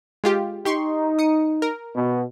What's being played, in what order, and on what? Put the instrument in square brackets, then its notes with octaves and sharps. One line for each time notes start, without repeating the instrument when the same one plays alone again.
[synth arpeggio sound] G#3 F4 G4
[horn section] D#4 [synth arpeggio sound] G4 C6 C#6
[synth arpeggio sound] D#6 C#7
A#4
[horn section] B2